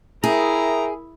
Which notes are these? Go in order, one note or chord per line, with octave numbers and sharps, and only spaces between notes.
E4 G#4 A#4 E5 G5 A#5 D#6